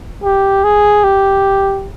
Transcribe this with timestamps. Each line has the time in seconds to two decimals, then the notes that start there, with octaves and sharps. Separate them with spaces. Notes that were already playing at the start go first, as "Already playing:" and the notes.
0.23 G4
0.64 G#4
1.04 G4